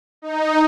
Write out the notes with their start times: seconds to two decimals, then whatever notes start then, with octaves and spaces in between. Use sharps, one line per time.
0.22 D#4